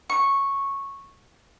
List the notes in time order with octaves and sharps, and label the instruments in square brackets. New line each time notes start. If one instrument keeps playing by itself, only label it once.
[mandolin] C#6